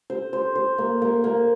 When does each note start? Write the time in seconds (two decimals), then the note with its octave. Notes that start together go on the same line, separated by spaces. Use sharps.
0.10 C5
0.33 C5
0.55 C5
0.78 A#3
1.02 A#3
1.24 A#3